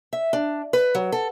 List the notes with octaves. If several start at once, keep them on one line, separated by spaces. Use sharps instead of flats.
E5
D4
B4
F#3
A4